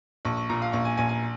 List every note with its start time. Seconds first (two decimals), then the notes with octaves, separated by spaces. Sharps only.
0.25 A#1 C#6
0.37 C#6
0.49 A#2 A#5
0.62 F5
0.73 A#1 C#6
0.85 G#5
0.97 A#1 G#5
1.09 G#5